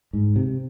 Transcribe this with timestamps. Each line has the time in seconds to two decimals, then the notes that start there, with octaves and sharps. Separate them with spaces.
0.13 G#2
0.36 C3